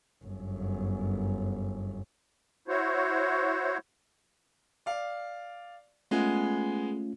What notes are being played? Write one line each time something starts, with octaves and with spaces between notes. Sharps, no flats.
G1 F#2
E4 F#4 C5 C#5
D5 F5
G#3 A3 B3 C#4 F4 G#4